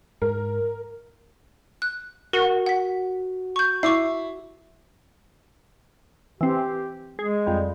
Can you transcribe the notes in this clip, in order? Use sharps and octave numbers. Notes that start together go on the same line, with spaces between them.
G#2 A#4
F#6
F#4 A#4
F#5 B6
C#6 G6
E4 C#6 D6 C7
E3 C4 G4
G#3 G#4
F2 G3